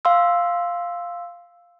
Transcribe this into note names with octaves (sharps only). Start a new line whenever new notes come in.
F5 C6 E6